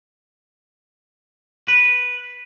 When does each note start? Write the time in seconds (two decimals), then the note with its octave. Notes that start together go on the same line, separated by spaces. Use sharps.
1.68 B4